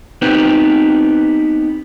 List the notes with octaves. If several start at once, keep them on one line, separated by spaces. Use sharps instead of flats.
B3 C4 D#4 G4 B4 C5